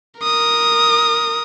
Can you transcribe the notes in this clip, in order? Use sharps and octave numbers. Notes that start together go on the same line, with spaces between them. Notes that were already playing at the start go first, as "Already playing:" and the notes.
A#4 D#6